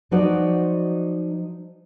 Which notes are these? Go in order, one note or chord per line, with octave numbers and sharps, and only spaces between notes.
F3 F#3 D#4 F#4 C5 D5